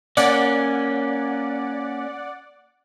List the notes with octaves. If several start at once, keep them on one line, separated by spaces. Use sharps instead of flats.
A#3 C#4 D5 F#5